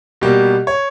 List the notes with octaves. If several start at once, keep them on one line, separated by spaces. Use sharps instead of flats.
B2 G3 A#3 G4
C#5